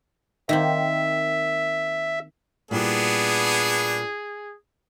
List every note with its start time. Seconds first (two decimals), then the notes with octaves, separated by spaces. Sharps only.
0.49 D#3 A#3 C4 E5
2.71 A#2 G3 B3 D4 E4 G#4